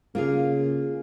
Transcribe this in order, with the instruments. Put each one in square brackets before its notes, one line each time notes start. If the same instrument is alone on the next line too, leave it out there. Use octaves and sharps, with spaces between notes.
[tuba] C#3 [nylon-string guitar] A#3 F4 G#4